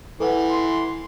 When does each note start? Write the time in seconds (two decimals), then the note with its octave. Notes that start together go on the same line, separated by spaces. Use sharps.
0.20 E3 A4 B4 F#5
0.52 C6